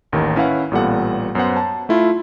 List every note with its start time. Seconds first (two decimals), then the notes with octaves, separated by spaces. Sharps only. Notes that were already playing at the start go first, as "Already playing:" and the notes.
0.12 A1 D#2 D#3
0.36 C#4 E4 B4 F5 F#5
0.71 A1 A#2 G3 B3 A4 F#5
1.35 F#2 B3 C5 F#5
1.57 A5
1.89 A3 E4 F4